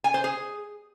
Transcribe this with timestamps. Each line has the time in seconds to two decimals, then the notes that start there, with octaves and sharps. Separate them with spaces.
0.04 G#5
0.14 C5
0.24 G#4